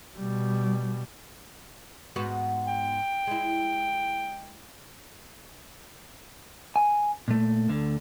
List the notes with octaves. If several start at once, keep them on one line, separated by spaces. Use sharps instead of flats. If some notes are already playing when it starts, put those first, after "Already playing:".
B2 G3
G#2 B3 F#4
G5
G#3 E4
G#5
A#2 A3
D2 D3